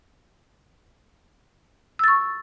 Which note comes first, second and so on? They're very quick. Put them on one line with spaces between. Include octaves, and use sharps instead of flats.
E6 A6 C#6